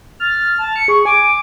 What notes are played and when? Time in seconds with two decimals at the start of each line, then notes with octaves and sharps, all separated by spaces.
0.20 F6 A6
0.58 A5
0.76 C#7
0.88 G#4 C#6
1.05 G#5 D6